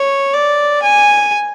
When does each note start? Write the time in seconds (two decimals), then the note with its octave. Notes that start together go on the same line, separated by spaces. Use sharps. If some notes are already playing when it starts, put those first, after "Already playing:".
Already playing: C#5
0.33 D5
0.82 G#5